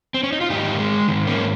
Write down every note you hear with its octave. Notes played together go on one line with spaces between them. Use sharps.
C4
C#4
D#4
F4
G#2 D#3 D#4 G4
G#3
G#2 D#3
A#3 C#4